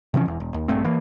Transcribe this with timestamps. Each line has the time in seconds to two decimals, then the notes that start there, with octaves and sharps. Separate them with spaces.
0.14 C3 E3 F3 C#4
0.26 E1 E2
0.40 E1
0.54 D#2
0.68 A#1 G2 A3 C4
0.84 E3 A#3